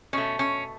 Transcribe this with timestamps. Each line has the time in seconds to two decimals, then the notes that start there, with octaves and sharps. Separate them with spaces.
0.13 B2 A3 C#4
0.39 C#4